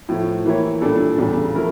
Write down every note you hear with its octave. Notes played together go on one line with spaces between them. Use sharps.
A2 F3 A3
E3 A#3 E4 G4 C#5
A#2 G3 D4 A4
E2 C#3 G3 D4 A4
F3 A3 E4 A#4